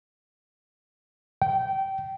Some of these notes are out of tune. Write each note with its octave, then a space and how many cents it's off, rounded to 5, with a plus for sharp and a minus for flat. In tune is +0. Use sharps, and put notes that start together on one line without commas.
G5 -20